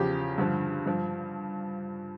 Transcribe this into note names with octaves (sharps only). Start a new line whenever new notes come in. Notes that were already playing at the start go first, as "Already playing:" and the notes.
Already playing: E2 C#3 F3 G4
G2 D3 F3
G2 F3